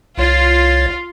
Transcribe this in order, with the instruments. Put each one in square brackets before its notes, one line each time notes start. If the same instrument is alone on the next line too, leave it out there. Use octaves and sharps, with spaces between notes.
[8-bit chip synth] C2 C#5 A6 [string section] F4